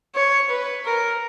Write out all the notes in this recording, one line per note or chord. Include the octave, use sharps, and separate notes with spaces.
C#5
B4
A#4